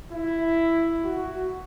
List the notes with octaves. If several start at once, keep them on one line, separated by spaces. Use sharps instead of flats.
E4
F#4